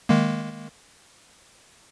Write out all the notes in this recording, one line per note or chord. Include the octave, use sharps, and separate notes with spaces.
D#3 G#3 A#3